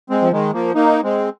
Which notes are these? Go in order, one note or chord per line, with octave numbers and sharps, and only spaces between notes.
G#3 C4
F3
D#3 G#3
F3 A#3
A#3 D#4
G#3 C4